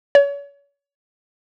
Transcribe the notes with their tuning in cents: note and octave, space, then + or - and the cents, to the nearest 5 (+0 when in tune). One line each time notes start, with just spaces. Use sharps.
C#5 +35